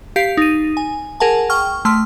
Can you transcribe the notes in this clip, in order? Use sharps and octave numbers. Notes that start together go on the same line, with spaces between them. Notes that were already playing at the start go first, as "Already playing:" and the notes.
G4 F5 B6 C7
D#4 D#7
G#5
G#4 A#4 F#5 G#5 A5
G5 C#6 F6
A3 C6 F6